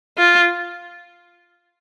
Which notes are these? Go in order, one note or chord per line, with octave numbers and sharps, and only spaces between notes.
F4